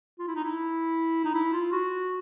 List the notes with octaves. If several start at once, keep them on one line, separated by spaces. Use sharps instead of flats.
F4
E4
D#4
E4
D#4
E4
F4
F#4